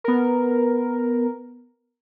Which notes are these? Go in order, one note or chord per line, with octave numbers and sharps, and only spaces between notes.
B3 A#4